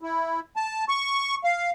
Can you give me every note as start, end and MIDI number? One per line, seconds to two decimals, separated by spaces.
0.01 0.40 64
0.56 0.84 81
0.89 1.35 85
1.44 1.71 77